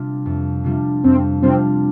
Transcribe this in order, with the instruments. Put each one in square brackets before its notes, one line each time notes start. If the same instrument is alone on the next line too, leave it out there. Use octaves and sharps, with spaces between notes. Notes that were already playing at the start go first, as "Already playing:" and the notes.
Already playing: [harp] C3 G3 D4 F4
F2
C3 G3 D4 F4
[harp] F2 [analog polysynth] C4
[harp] C3 G3 D4 F4 [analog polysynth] C4